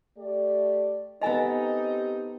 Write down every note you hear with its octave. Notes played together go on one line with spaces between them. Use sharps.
A3 G4 D5
B3 C4 D#4 G4 A4 D#5 G#5 A#5